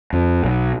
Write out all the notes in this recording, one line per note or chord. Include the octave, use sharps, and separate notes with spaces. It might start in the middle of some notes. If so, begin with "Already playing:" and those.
F2
B1